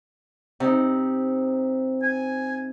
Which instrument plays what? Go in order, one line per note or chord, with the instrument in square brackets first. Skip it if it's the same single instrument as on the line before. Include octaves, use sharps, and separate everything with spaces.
[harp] C3 D#4
[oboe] G#5